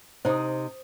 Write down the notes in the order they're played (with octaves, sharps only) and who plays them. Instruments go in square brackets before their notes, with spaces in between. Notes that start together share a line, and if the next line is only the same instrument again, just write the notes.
[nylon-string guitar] C3 D#4 [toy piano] C5 D#6